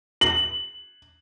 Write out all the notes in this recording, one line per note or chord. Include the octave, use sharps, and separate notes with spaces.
F#7